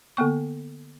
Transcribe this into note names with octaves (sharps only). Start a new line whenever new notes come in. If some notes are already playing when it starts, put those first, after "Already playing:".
D3 A#3 B3 C#6